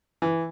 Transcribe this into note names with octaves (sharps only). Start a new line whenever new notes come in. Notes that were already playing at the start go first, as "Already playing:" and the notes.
E3